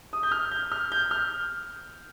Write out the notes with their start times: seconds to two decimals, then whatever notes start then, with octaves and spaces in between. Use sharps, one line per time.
0.13 D#6
0.23 G6
0.32 F6
0.51 G6
0.72 F6
0.92 G6
1.11 F6